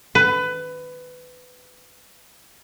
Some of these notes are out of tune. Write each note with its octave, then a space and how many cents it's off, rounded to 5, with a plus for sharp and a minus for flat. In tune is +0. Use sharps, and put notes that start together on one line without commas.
B4 +20